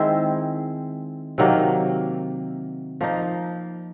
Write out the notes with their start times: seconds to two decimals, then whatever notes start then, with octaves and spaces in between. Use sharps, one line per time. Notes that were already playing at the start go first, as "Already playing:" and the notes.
Already playing: D#3 G#3 C4 E4
1.38 C3 D#3 F#3 A#3
3.01 F3 A#3 D#4